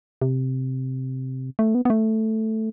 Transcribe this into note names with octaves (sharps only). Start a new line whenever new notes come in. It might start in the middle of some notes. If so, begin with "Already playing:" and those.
C3
A3
B3
B3
A3